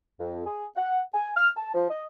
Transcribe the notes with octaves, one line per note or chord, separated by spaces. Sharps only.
F2
G#4
F#5
G#5
F6
A5
F3
D#5